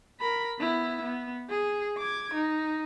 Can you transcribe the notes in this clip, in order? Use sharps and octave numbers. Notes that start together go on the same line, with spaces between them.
A#4 B5
B3 E4
B3
G#4
D6 G#6
D#4